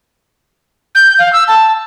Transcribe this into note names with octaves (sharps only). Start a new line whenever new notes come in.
G6
F5
E6
A5